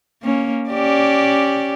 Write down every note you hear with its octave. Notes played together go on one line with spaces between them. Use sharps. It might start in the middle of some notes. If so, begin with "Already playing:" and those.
A#3 C#4
C#4 G4 D5